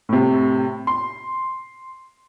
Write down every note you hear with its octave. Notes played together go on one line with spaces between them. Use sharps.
A2 C3
C6